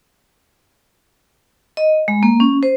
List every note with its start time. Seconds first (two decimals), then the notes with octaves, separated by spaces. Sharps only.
1.77 D#5
2.08 G#3
2.23 A#3
2.40 C#4
2.63 C5